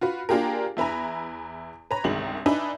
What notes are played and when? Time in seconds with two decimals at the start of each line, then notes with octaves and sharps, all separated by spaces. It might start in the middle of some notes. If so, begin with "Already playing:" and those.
0.01 F4 F#4 B4
0.29 A#3 D4 F4 G4 G#4 A#4
0.77 E2 E4 B4 G#5 A#5
1.91 B4 C#5 A#5
2.04 G1 C2 D#3 G#3 F#7
2.46 D4 D#4 B4 E5 G#5